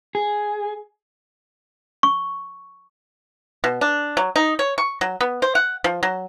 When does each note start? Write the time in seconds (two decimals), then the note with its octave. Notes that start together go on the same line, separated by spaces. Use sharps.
0.15 G#4
2.03 C#6
3.64 B2
3.81 D4
4.17 F#3
4.36 D#4
4.59 C#5
4.78 C#6
5.01 F#3
5.21 B3
5.42 C5
5.55 F#5
5.84 F3
6.03 F#3